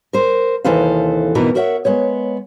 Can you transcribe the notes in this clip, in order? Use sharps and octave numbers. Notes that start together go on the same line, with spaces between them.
A#4 C5
D#2 C3 E3 A4 C5 F5
F2 B2 E3 D#4 A#4
F#4 A#4 C#5 E5 F#5
G#3 B3 C#5